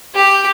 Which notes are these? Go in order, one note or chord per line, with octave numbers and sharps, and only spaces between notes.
G4